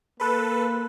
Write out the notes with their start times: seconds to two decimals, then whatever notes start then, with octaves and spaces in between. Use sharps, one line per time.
0.20 A#3 A4 B4 B5 C6 F#6